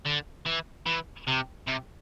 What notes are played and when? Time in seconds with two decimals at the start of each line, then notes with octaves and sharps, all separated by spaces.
0.05 D3
0.46 E3
0.86 E3
1.27 C3
1.67 C3